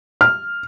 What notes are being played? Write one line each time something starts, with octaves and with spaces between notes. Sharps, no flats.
F6